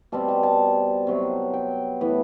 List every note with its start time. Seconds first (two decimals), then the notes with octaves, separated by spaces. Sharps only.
0.12 B2 G3 C4 A5
0.28 A5
0.43 A5
1.07 C3 F#3 B3
1.53 G5
2.01 A2 E3 B3